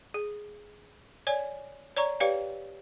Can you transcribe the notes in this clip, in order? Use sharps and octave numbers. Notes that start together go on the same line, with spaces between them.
G#4
C#5 D5 G#5
C#5 D5 A#5 C#6
G4 B4 C#5 D5 F5 G5